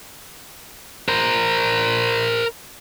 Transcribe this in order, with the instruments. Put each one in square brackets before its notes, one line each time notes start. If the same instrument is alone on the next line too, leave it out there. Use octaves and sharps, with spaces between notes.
[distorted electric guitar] A#4 C5